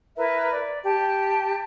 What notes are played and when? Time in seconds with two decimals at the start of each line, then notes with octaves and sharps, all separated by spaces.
0.17 E4 A#4 B4 E5
0.52 D5
0.84 G4 A5